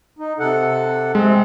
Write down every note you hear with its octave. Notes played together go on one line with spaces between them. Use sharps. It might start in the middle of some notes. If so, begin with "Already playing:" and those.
D#4
C3 A4 F#5
C3 G#3 C4